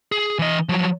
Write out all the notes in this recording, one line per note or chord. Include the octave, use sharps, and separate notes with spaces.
G#4
E3 D#5
F3 F#3